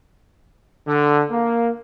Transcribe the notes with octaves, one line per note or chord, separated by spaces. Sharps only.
D3
A#3